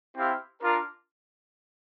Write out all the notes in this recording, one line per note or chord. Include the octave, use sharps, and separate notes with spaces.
C4 E4 G4 C5 F5
D4 F4 A#4